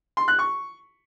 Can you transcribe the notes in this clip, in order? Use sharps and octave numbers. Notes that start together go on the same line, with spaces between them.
C6
F#6
C#6